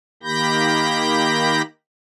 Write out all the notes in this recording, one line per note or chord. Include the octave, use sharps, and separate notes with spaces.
D#3 A#3 G4 B5 G6 A#6